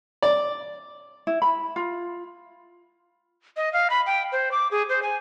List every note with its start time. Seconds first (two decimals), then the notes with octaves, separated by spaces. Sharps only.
0.22 D5
1.27 E4
1.42 B5
1.76 F4
3.57 D#5
3.73 F5
3.90 B5
4.06 G5
4.32 C5
4.52 D6
4.71 G#4
4.89 C5
5.03 G#5